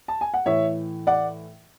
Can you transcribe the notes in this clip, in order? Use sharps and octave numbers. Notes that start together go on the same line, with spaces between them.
A5
G#5
F#5
A2 E3 C#5 E5
D5 F#5